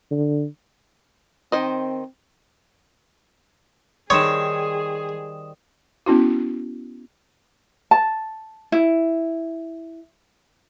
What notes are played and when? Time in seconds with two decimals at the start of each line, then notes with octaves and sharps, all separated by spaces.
0.11 D3
1.52 D#3 C4 C5 D#5
4.10 D#3 G3 C4 G#4 C#5 D#6 E7
6.06 B3 C#4 E4 F#4
7.91 A5
8.72 E4